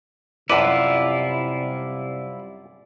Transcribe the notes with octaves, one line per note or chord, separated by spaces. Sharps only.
F#2 C3 G3 E4 F4 B4 D5